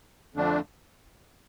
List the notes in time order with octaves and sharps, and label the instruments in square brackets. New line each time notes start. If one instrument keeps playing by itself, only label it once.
[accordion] F2 D3 A3 D4